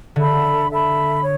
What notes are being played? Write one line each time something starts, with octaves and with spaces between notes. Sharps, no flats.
D3 A4 E5 B5
A4 E5 B5
C#5